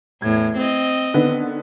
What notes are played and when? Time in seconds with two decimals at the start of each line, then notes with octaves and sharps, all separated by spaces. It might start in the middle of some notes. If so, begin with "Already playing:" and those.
0.22 E2 A2 G#6
0.57 C4 D#5
1.14 D3 D#3 B3